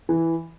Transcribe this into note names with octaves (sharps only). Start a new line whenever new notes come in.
E3